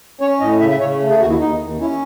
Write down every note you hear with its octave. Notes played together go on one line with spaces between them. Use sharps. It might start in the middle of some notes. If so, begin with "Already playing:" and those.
C#4 C#5
A2 D#5
C#3 E5
E5
C#3 C#5
A3
G#4
D#2 F#4
E4
D#2 D#4
D#2
C#4 E4